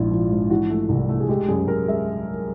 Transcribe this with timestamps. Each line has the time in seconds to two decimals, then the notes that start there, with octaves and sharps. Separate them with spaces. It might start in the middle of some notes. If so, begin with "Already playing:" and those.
Already playing: A#1 G#2 E4 F4
0.11 F3
0.30 G#2
0.50 E3 F#4
0.70 A3
0.89 C2
1.09 A3
1.20 G#4
1.28 G#3 G4
1.48 F#2 G#4
1.67 F#2 A#4
1.88 G#3 E5